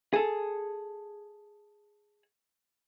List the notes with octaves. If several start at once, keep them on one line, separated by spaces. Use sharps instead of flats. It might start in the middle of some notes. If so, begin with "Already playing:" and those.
G#4 A4